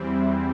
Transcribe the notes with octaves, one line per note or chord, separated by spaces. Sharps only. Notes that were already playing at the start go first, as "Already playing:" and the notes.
Already playing: E2 E3 G3 C4 E4